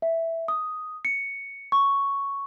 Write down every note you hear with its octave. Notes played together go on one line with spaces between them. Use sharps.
E5
D#6
C#7
C#6